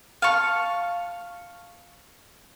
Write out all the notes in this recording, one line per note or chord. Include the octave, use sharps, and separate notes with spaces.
F5 A5 C#6